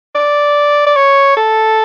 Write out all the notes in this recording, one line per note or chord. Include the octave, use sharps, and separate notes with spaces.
D5
D5
C#5
A4